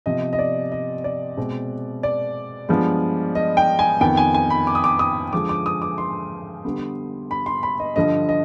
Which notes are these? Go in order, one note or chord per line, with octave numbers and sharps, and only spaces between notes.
C3 F3 B3 D#5
D#5
D5
D#5
D5
B2 G#3 C4
D5
G2 F3 G#3 B3
D#5
G5
G#5
F2 D#3 B3 G5
G#5
G#5
B5
D6
D#6
D6
D#6
D3 F3 G#3 D6
D6
D#6
D6
C6
D3 G3 B3
B5
C6
B5
D#5
G2 D3 F3 D#5
D#5